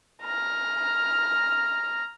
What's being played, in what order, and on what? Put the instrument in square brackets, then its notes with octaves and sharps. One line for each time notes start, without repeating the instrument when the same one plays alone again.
[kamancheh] A#5 F6